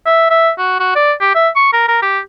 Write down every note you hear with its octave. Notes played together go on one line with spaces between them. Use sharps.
E5
E5
F#4
F#4
D5
G4
E5
C#6
A#4
A#4
G4